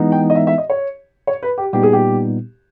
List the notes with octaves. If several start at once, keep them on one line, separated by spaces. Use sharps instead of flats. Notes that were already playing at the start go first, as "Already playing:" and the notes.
Already playing: E3 G#3 B3 D#4
G5
D#5
E5
E5
D#5
C#5
C#5
B4
G4
A#2 G3 B3 D#4 G4
G#4
G4